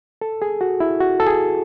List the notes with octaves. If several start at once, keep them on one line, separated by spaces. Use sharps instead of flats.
A4
G#4
F#4
E4
F#4
A4
G#4